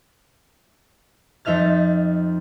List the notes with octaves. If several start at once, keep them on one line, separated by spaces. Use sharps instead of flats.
F2 D#4 E5 F6 A6